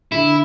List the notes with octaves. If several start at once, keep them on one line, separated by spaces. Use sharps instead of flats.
D3 E4